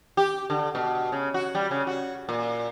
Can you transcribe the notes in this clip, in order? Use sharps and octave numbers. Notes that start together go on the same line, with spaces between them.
G4
D3
B2
C#3
F#4
G3
C#3
F#4
A#2